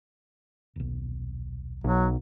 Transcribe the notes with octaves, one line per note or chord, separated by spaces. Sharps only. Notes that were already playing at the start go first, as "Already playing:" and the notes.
D#1 B1
B1 F#3